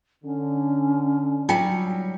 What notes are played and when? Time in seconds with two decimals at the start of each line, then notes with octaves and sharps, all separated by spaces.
0.24 D3 C#4
1.49 F#3 G3 D#4 F4 G5